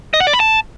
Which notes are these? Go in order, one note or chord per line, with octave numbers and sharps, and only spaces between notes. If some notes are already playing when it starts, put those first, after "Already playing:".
D#5
F#5
D5
B5
A5